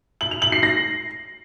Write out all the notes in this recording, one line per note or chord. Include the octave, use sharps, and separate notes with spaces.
F#7
F7
F#7
C7
A#6